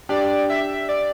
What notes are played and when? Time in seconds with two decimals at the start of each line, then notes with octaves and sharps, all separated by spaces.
0.09 D4 G4 D5
0.50 E5
0.89 D5